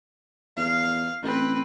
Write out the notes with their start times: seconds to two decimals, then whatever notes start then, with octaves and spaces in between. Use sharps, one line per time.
0.57 E2 F5
1.23 A1 C4 B4